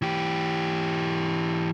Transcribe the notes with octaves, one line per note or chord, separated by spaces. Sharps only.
E3 G4